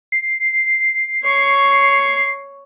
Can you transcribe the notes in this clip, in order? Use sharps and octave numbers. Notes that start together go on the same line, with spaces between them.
C7
C#5 C#6